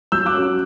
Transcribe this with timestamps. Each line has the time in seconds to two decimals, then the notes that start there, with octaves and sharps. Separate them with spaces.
0.12 F#3 E6 G6
0.26 D6 F#6
0.33 C#4 F#4